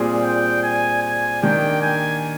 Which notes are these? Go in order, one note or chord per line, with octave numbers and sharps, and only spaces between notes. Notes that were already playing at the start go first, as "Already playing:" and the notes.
Already playing: A#2 G3 C4 F4 G#4
G5
G#5
G#5
D#3 A#3 D4 G4 G5
G#5